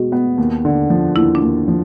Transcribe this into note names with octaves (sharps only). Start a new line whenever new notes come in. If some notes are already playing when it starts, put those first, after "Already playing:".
Already playing: B2 G#3 F#4
B3
D#2
D3
F3
D#2 E4
D4
D#2
F3